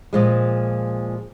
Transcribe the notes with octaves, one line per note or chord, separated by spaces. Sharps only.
A#2 F3 G#3